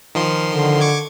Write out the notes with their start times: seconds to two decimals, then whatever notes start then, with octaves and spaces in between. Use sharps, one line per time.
0.15 D#3 F3 C6
0.52 D3
0.81 C#6 D6 G#6